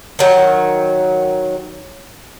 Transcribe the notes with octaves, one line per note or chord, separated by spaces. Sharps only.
D#3 F#3